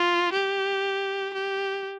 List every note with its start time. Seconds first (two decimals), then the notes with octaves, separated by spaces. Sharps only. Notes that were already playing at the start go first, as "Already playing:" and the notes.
Already playing: F4
0.33 G4
1.34 G4